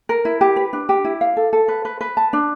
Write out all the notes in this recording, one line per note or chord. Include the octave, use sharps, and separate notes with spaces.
A#4
E4
G4
B4
D4
G4
E4
F5
A4
A4
B4
B4
B4
A5
D4